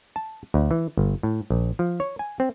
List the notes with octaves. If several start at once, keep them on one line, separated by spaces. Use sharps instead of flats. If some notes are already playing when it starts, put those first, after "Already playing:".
A5
D2
E3
G1
A2
A#1
F3
C#5
G#5
C4